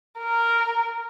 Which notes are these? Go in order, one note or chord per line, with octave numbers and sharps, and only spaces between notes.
A#4